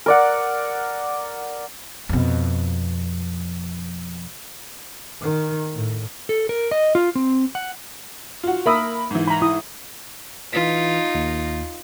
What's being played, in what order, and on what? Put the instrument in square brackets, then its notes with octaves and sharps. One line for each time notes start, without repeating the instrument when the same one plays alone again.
[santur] A#4 D5 F#5
[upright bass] F2 B2
[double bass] D#3
A2
[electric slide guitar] A4
A#4
D#5
F4
C4
F#5
[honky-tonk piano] F4 F#4
[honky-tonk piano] A#3 B5 [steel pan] A#4 E5 D#6
[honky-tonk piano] G#2 E3
[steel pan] A#5 B5
E4 D#6
[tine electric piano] E3 B6 [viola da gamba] D#4 F4
[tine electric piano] D#2